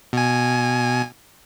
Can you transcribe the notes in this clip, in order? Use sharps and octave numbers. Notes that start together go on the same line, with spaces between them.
B2 G#5